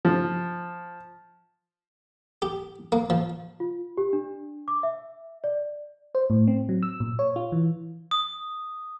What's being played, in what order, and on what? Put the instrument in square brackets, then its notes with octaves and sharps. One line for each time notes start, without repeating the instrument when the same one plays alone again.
[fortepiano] F3
[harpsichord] G4
A#3
F3
[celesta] F4
G4
D4
D6
E5
D5
[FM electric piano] C5
A2
C4
F#3
E6
A#2
C#5
F4
E3
[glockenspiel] D#6